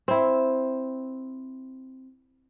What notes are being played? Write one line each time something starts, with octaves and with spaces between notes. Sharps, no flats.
C4 E4